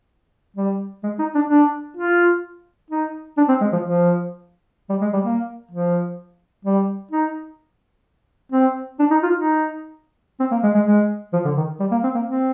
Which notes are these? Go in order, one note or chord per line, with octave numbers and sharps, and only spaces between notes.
G3
G#3
D#4
D4
D4
F4
D#4
D4
C4
G#3
F3
F3
G3
G#3
G3
A#3
F3
G3
D#4
C4
D4
D#4
F4
D#4
C4
A#3
G#3
G#3
G#3
F3
D3
D#3
G3
A#3
C4
A#3
C4